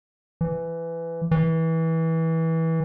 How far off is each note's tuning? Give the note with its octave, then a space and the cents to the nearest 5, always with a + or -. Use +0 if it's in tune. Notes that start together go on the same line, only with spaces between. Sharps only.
E3 +15
E3 -20